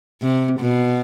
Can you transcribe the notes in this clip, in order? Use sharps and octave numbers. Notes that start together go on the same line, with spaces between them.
C3
B2